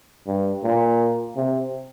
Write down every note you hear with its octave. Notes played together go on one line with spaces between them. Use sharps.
G2
A#2
C3